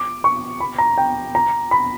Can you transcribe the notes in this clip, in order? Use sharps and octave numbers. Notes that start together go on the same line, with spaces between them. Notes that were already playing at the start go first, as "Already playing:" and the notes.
Already playing: D6
C#6
B5
A#5
G5
A#5
B5